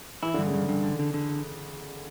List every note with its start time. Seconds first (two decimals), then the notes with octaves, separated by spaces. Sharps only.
0.23 E3 E4
0.34 D3
0.38 G2
0.46 C#3
0.54 G2
0.69 G2
0.83 D3
0.99 D3
1.14 D3